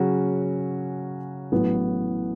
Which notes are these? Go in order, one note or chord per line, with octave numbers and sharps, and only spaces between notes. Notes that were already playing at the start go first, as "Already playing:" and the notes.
Already playing: C#3 F#3 C#4 F#4
A1 A2 F#3 B3